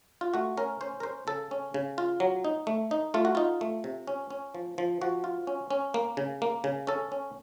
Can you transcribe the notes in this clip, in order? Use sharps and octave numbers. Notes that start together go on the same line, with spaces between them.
F4
A3 F#4
C#4 A#4
C#4 C5
A#4
C#4 C5
C#3 A4
C#4
C#3
F4
F#3
D#4
A3
D#4
A3 F4
F#4
D#4 F4
A3
C3
C#4
C#4
F3
F3
F3 F#4
F4
C#4
C#4
A#3
C#3
A#3
C#3
C#4 A4
C#4